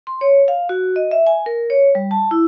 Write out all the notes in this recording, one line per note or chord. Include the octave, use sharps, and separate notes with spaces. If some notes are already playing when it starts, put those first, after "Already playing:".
C6
C#5
F5
F#4
D#5
E5
G#5
A#4
C#5
G3
A5
E4